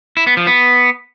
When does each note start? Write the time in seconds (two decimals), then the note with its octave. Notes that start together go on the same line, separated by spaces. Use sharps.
0.17 E4
0.27 B3
0.37 F3
0.47 B3